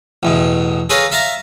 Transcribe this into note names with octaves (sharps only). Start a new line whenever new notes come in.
A1 E2 B2
G#4 A4 B4 C#5 F5 A#5
E5 F5 A5 A#5